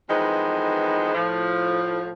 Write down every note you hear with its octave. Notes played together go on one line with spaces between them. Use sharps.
F2 D#3 E3 G#3 B3 C5
A2 F3